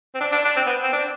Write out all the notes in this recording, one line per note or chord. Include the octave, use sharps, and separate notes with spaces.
C4
D4
D4
D4
C4
B3
C4
D4